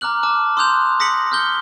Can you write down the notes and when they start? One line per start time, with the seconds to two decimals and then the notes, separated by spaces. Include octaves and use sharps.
0.01 A#5 D6 F6 F#6 F#7
0.23 A5 D6 F6
0.57 C6 D#6 E6 F#6 G6 F7
1.00 D#6 A#6 B6 C#7 F#7
1.32 F6 G6 G7